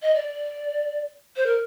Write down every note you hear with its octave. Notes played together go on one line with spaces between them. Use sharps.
D#5
D5
C5
A#4